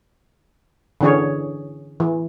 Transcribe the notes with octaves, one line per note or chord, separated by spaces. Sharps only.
D3 E3 C#4 G#4 C#5
E3